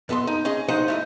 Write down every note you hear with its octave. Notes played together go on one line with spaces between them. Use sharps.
F#2 B3 A4 D#5 C6
D#4
C#4 G#4 D#5
D3 F3 D#4 C5 D#5 F#5
A3 E4 D#5